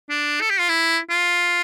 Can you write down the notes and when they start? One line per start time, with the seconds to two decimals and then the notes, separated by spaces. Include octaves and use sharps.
0.10 D4
0.41 A4
0.50 G4
0.59 F4
0.69 E4
1.10 F4